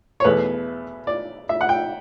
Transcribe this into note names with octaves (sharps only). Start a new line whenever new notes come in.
C#5
E2 B2 A3 B4
D5
E5
F#5
G5